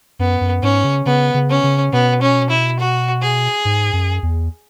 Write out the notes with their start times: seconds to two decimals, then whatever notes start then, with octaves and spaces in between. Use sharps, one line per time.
0.19 F#2 B3
0.41 F#2
0.62 G#2 C#4
0.84 C#3
1.06 C#3 B3
1.34 C#3
1.50 C#4
1.64 C#3
1.93 B2 B3
2.22 C#4
2.50 E4
2.79 F#4
3.22 G#4
3.65 G#2
3.93 F#2
4.23 E2